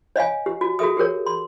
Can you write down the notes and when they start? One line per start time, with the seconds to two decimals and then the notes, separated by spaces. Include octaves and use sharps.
0.16 C#5 D#5 F5 G#5
0.46 G4
0.61 F#4
0.79 F#4 G#4 A4 E5 D#6
0.97 G4 G#4 A#4 C#5
1.26 C6